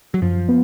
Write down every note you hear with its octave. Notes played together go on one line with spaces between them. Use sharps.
F#3
F#2 F3
B3